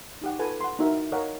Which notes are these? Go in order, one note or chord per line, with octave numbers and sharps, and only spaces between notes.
D#4 G4 F#5
F4 A4 B4 G#5
F#5 C6
D#4 E4 F#4 A#4 E5
A#4 C#5 D#5 F5 F#5 G#5